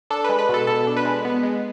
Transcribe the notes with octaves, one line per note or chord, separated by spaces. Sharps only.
D4 A4
G#3 B4
B4
B2 A4
B2 A4
D4
B4
G#3
B3
G#3